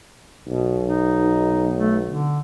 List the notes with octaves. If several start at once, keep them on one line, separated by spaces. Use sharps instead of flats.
B1 B2
D#4
A3
D3